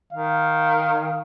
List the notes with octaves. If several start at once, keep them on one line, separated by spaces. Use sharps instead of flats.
D#3 F5